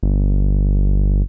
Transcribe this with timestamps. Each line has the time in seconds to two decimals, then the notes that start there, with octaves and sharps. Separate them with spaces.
0.03 G1